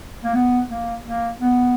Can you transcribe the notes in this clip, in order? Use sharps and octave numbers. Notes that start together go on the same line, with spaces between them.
A#3
B3
A#3
A#3
B3